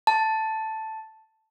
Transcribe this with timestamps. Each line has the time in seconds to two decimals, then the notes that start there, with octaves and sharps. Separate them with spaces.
0.07 A5